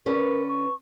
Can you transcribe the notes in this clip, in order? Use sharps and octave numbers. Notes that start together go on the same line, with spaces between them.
D3 C#4 A#4 B4
C#6